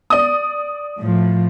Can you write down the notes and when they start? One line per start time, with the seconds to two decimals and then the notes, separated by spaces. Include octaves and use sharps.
0.10 D5 D#6
0.99 A2 F3